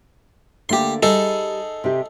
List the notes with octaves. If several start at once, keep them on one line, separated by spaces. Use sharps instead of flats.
D3 A3 A#3 G4 C6
G3 D#4 G#4 A4
C3 G4